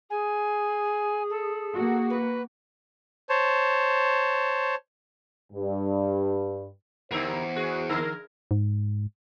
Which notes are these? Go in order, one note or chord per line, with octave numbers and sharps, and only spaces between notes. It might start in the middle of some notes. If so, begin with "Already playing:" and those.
G#4 G#5
A4
A#3 F#4
B4
C5 C#5 A5
G2
E2 D3 G4 A#4 C5
F#4 G#4
D3 A#4
G#2